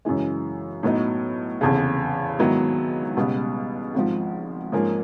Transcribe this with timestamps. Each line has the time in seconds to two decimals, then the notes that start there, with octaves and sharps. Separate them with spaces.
0.05 F#2 C#3 E3 G#3
0.83 A2 F#3 B3 D#4
1.61 F1 E2 C#3
2.39 G#2 D#3 F#3 B3 E4
3.17 C#2 B2 G3 B3
3.94 G#1 G#2 F3
4.72 G#2 F3 A#3 C#4